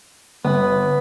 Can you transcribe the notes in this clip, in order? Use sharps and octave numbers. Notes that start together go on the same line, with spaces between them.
G1 B3